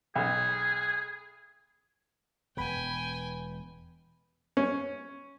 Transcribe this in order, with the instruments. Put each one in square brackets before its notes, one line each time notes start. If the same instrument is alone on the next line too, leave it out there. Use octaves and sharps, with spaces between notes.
[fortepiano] B1 [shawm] G#4
[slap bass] E1 B2 [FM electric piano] B3 B4 B5 [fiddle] G5 G#5
[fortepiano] C#4